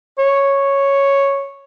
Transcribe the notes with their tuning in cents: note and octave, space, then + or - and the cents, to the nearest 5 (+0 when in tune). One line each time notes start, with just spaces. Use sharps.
C#5 -5